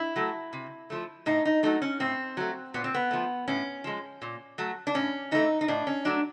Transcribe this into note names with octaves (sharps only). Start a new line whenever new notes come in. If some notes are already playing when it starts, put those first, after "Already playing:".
Already playing: E4
F#3 A3
C3
F3 A3
A2 D#4
D#4
F#3 A3 D#4
C#4
A2 C4
F#3 A3
A#2 B3
C4
B3
F3 A3
A2 C#4
F3 G#3
A#2
F#3 A3
D4
A2 C#4
E3 A3 D#4
D#4
A2 D4
C#4
F#3 A3 D4